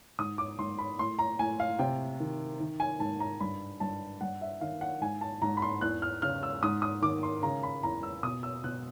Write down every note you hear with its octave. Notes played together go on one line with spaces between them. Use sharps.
G#2 D#6
D6
G#2 C6
B5
A2 C6
A#5
A2 G#5
F5
C3 G5
D#3
D#3
G#5
G#2 A5
A#5
G2 B5
G2 A5
G2 F#5
E5
D#3 F5
F#5
G#2 G#5
A5
G#2 A#5
B5
C6
E2 F#6
F6
C#3 F6
E6
G#2 D#6
D#6
D#3 D6
C6
C#3 A#5
B5
E2 A#5
E6
B2 D#6
E6
B2 F#6